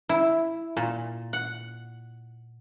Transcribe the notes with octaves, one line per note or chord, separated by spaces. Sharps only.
E4
A#2
F#5